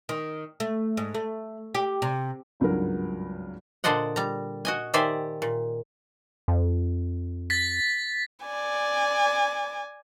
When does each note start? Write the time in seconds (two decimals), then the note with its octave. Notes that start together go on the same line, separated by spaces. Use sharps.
0.09 D#3
0.60 A3
0.97 G#2
1.14 A3
1.75 G4
2.02 C3
2.60 G#1 C#2 G2 F#3 A#4
3.84 A#2 D3 C5 D5 D#5 F#5
4.16 G3 A#5
4.65 F#4 D#5 G#5
4.94 D#3 G4 C5 D5 E5 G#5
5.42 A#2
6.48 F2
7.50 A6 B6
8.46 D5 G#5